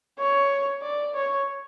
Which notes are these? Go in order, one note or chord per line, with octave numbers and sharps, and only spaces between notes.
C#5
D5
C#5